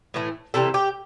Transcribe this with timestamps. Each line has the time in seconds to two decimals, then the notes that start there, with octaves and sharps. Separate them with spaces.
0.14 A2 E3 A3
0.54 C3 E3 G3 A4
0.74 G4